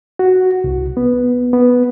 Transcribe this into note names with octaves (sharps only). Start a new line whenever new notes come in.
F#4
C2
B3
B3